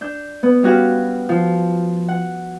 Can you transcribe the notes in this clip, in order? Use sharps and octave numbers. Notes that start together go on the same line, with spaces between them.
D4 G6
B3
G3 C#4 F#4 G4 F5
F3
F#5